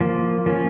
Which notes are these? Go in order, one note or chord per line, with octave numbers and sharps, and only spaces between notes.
F3 A#3
F3 A#3 C#4